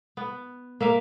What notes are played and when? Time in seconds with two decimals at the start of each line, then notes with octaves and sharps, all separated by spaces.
0.17 B3
0.80 A#3 E5 F5